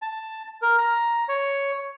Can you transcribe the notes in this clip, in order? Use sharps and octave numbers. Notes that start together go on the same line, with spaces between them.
A5
A#4
A#5
C#5